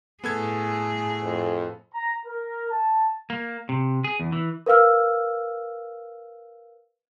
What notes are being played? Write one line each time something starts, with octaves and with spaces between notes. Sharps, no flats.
A2 B3 G#4 A4 G#6
F2
A#5
A#4
A5
A#3
C3
G#4
E2
E3
A#4 B4 F5 E6 F6